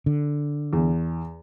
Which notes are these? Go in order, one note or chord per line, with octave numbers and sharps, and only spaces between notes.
D3
E2